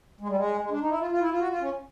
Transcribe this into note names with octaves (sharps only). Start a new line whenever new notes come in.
G#3
G3
G#3
G#3
D4
D#4
E4
F4
F4
E4
F4
F#4
F4
C#4